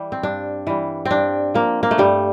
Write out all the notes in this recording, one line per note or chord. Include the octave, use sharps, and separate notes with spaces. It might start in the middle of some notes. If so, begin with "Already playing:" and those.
Already playing: E3 G3
C4
G2 D4
E3 G3
C4
G2 D4
F3 A#3
A#3
A3
G2 G3